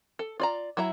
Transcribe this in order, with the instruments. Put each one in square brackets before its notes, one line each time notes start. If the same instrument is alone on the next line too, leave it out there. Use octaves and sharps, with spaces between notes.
[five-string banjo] A4
F4 D5 A#5
F#3 E4 E5 A#5